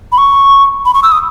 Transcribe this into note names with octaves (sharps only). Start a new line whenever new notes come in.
B5
C#6
B5
C#6
E6
D#6